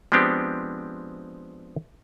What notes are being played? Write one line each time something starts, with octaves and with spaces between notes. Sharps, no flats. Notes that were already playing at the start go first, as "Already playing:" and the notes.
F3 G#3 B3 C4 D4 G4